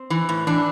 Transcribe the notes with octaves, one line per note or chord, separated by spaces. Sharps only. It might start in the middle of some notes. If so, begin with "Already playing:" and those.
Already playing: C4
E3
A2
E3 D4